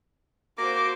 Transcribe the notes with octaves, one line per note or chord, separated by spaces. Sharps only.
A#3 F#4 C5 D6